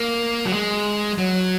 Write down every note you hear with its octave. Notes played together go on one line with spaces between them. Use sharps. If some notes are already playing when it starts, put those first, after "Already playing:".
Already playing: A#3
F#3
G#3
F#3